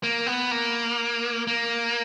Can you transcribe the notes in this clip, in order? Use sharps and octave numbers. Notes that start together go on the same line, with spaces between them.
A#3
B3
A#3
A#3